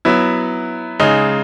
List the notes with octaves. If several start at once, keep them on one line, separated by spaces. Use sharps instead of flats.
F#3 B3 E4
C#3 G#3 D#4